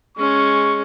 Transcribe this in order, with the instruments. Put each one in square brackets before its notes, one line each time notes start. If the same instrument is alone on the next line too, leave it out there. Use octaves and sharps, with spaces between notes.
[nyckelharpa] G#3 C#4 [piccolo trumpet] C#6